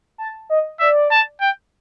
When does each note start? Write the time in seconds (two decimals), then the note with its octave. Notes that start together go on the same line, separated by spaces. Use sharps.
0.18 A5
0.50 D#5
0.80 D5 E5
1.11 A5
1.41 G5